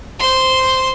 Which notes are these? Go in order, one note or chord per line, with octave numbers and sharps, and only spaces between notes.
C5 C6